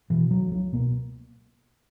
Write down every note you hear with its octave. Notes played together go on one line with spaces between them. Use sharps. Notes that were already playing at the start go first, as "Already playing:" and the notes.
B2 E3
C#2 F#3
C#2 F#3
B2 A#3